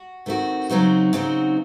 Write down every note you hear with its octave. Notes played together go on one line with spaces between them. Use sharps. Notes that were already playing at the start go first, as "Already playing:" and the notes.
Already playing: F#4
D#3 A3 C4 F#4
C#3 F#3 C4 D#4 F#4
C#3 F#3 C4 D#4 F#4